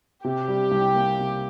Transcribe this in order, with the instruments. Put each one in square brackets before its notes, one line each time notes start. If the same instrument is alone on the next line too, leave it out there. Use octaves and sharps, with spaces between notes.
[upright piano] C3 [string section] G4
[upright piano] G3
C2
A#3
C3